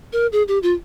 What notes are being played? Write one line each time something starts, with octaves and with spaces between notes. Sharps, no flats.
A#4
G#4
G4
F4